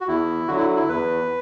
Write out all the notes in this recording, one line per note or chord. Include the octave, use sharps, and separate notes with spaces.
F#4
E2 E4
D3 F#3 F#4
E4
E4
E2 B4